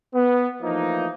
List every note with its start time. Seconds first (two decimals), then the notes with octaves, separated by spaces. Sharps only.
0.14 B3
0.62 E3 F3 A3 A#3 D#4